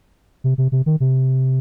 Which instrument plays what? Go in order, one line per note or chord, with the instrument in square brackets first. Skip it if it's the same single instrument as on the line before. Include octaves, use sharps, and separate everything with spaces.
[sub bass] C3
C3
C3
D#3
C3